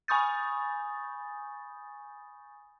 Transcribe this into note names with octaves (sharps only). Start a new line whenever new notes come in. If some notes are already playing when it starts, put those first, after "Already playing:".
G#5 B5 C#6 D#6 G6 A6